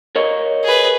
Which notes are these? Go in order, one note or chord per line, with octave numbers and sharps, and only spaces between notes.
A#4 C#5 D#5
G#4 B4